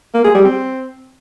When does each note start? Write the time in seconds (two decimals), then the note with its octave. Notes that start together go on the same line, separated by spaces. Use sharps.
0.14 A#3
0.24 G#4
0.34 G3
0.44 C4